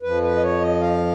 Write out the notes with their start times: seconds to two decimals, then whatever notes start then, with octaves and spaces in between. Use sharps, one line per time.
0.02 F2 F3 B4
0.22 B4
0.35 D#5
0.42 C#5
0.61 D#5
0.81 F5